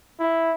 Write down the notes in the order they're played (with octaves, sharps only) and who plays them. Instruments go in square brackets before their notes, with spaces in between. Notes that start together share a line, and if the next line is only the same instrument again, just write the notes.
[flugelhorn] E4